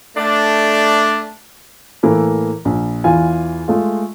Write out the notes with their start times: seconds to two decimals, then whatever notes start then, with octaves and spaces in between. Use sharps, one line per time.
0.17 A3 D4
2.03 A2 E3 A#3 A4
2.65 A#1
3.04 E2 E3 F4 G#5
3.68 G#3 A3 F4